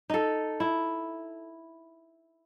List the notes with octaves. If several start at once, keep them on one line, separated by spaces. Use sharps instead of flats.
D#4 A4
E4